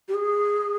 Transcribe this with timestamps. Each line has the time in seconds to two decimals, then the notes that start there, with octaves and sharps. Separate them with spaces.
0.08 G4
0.14 G#4